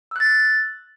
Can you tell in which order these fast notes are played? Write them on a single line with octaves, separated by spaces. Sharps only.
E6 F#6 A6